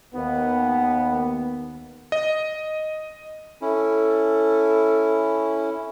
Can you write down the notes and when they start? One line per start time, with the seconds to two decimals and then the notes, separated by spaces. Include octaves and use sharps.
0.15 D#2 B3
2.12 D#5
3.62 C#4 E4 A4